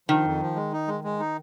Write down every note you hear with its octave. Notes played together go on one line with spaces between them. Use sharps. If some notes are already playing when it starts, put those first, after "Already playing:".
D#3 F3
F2
F3
G#3
D#4
G#3
G#3
D#4